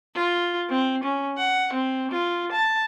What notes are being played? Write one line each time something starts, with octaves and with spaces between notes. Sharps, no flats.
F4
C4
C#4
F#5
C4
F4
A5